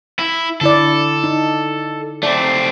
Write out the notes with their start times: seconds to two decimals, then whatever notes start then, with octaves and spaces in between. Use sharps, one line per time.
0.19 E4
0.61 D3 E4 A4 D5
1.24 D#4
2.23 A3 C4 D5